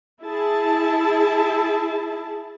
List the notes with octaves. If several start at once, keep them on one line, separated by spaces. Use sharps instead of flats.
E4 G#4 A5